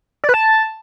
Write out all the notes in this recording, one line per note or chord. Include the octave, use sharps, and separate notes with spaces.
D5
B4
A5